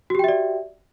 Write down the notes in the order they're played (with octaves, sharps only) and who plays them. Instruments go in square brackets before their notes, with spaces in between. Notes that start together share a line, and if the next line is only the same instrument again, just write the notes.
[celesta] F#4
G4
G5
E5
D5